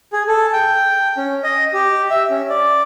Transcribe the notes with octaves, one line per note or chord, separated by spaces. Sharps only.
G#4
A4
G5
C#4
D#5
G4
E5
C#4
D5